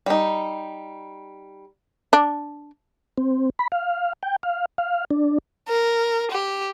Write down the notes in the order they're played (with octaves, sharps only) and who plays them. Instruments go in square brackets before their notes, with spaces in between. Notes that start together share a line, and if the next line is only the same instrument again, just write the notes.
[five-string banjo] G3 D#4
[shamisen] D4
[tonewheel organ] C4
B5
F5
G5
F5
F5
D4
[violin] A#4
G4